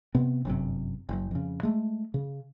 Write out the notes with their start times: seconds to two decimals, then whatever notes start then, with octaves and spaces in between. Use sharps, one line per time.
0.15 C3 B3 C4
0.45 G1 F#2 A2 C3
1.09 F#1 F#2
1.31 F2 C#3
1.63 G#3 A3
2.14 C#3